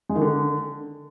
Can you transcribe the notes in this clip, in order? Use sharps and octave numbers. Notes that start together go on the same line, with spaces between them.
G#3
D#3
D3